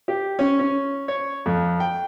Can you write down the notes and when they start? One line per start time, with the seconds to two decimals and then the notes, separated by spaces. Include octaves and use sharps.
0.08 G4
0.39 C#4
0.59 C#4
1.08 C#5
1.46 F2
1.80 G5